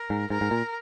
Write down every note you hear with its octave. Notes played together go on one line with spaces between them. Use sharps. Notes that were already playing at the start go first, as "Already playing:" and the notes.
Already playing: A#4
G#2
G#2 A#4
G#2
A#2